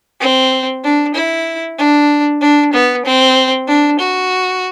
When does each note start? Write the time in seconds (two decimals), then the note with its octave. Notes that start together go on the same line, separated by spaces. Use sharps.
0.20 C4
0.84 D4
1.15 E4
1.78 D4
2.41 D4
2.73 B3
3.05 C4
3.67 D4
3.99 F#4